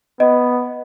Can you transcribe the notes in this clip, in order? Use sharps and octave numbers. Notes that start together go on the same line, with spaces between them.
B3 D#5